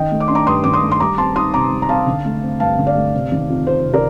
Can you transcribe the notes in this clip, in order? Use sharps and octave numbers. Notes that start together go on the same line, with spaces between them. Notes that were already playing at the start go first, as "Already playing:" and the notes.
Already playing: D#3 D#5 G5
A3
D6
D4 C6
A#5 D6
G2 C6 D#6
D#3 D6
C6 D#6
A3
C6
G3 A#5 D6
C4 A5 C6
D#4 C6 D#6
C3 A#5 D6
G3
A#5
C4 F5 A5
D3
A3
C4
G2 F5 A5
D3
D5 F5
A3
C3
D#3
F2
F2 C5
C3
A#4 D5